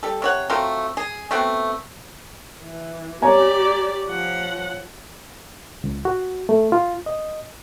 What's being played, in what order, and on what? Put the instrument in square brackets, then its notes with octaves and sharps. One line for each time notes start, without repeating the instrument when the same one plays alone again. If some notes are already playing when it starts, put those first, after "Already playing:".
[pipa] G3 A4
C3 C#5 F#5
F#3 A3 C4 F4
G#4
A3 B3 C4 F#4
[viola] E3
[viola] G4 D5 [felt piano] C#5 G#5 A#5
[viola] F3 F#5
[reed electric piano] C#2
F#4
A3
F4
D#5